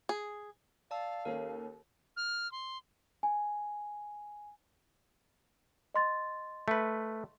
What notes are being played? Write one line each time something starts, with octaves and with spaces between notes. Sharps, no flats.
G#4
D5 F5 A5 E6
D#2 C#4 A4 A#4
F6
C6
G#5
D#5 C6 A6
A3 B4